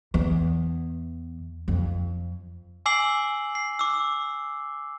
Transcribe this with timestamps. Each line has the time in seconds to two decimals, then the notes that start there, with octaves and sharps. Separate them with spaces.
0.14 E2
1.68 F2
2.86 G#5 D6 E6 C7 F#7
3.55 C7
3.79 D6 E6